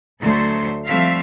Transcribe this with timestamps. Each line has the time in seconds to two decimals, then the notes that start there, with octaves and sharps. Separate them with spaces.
0.21 D2 F#3 A3 A4 C5
0.85 F3 G3 A3 C4 E5 F5